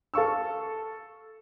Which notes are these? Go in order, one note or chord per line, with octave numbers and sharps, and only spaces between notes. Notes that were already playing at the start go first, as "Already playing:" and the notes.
A4 F5 C#6 E6